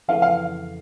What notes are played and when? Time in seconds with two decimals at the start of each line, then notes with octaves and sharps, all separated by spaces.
0.08 F2 C#3 E3 A3 F5
0.22 F5